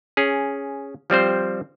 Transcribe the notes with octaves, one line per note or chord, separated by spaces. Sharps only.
C#4 G#4
F3 G3 C4 C5